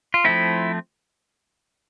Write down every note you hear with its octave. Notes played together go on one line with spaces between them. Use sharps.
F4
F3 A3 C4 E4